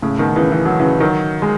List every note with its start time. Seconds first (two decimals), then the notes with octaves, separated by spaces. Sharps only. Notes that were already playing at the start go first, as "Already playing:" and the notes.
0.02 A2 C#3
0.19 B2 D#3
0.35 C#3 E3
0.52 E3
0.65 F#3
0.79 C#3 E3
1.00 D#3 F#3
1.42 G#3